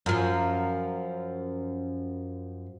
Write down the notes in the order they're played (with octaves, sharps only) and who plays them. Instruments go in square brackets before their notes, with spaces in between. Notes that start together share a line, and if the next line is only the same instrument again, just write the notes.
[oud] F#2 F3